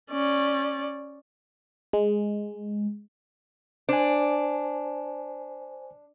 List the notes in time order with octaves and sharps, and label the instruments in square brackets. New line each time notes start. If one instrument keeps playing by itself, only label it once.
[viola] C#4 D5
[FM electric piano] G#3
[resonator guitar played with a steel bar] D4 [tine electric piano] C5 G#5